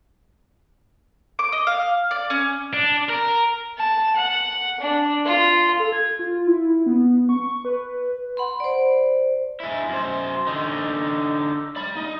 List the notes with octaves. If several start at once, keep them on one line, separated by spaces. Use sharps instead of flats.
D6
D#5
F5
D5
C#4
D4
A#4
A5
F#5
D4
F4
A4
G#6
F4
E4
B3
C#6
B4
F#5 B5 C6
C5 D5
G#3 E4
F#2 C5
D3 D#4
D5 B5
D#4